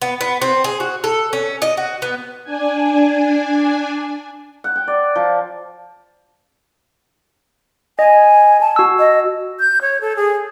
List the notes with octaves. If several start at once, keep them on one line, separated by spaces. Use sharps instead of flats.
B3
B3
C4
G#4
F#4
A4
C#4
D#5
F#4
B3
D4 G#5
F#5
G5
D5
F3
D#5 G#5
A5
F#4 E6
D#5
G6
C#5
A4
G#4